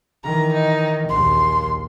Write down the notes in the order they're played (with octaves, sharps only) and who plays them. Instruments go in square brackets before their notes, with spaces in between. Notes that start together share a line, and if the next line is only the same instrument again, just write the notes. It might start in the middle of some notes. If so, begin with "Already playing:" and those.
[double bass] D#3 E3 [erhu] A#5
[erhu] D#4
[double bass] A#1 D#2 [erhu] C6